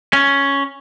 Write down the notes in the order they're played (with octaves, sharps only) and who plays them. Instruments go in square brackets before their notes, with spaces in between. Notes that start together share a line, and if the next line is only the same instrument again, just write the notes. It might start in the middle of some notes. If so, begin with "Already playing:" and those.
[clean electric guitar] C#4